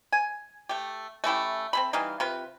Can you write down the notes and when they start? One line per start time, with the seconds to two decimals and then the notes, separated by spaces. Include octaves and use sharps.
0.13 G#5
0.69 A3 G4
1.24 A3 C#4 E4 G4
1.73 C4 A4 B5
1.93 E3 G3 D#4 F5
2.20 C3 F4 B4